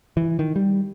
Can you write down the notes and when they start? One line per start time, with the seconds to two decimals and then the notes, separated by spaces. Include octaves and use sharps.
0.17 E3
0.39 D#3
0.56 G3